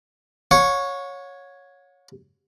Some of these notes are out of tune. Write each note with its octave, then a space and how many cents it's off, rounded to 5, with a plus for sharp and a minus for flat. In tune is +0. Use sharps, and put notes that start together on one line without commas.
C#5 +0 F#5 -45 C#6 +0